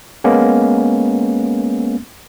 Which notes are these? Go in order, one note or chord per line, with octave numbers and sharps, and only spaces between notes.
G#3 A#3 B3 C#4